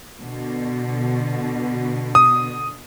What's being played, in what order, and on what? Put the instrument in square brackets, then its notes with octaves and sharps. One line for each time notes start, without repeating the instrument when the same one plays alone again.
[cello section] B2 D3
[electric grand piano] D#6